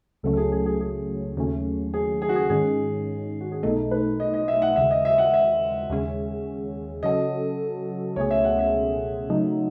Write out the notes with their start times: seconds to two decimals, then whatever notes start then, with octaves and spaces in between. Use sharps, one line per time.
0.23 C#2 C#3 F#3 A3 C#4 A4
0.33 A4
0.37 G#4
0.52 G#4
0.66 G#4
0.81 G#4
1.37 D#2 C#3 F#3 A3 C#4
1.94 G#4
2.22 G#4
2.29 F#4
2.36 G#4
2.50 G#2 D#3 G#3 C#4 G#4
3.41 F#4
3.52 G#4
3.63 B1 B2 A3 D#4 A4
3.91 B4
4.20 D#5
4.34 D#5
4.48 E5
4.62 F#5
4.76 D#2 C#3 G#3 E5
4.91 D#5
5.05 E5
5.18 F#5
5.34 E5
5.90 D#2 C#3 G#3 C#4 G#4
7.03 C#3 F#3 C#4 F#4 A4 D#5
8.16 C#2 B2 A3 C#4 G#4 C#5
8.31 E5
8.44 F#5
8.59 E5
9.29 C#3 F#3 A3 D#4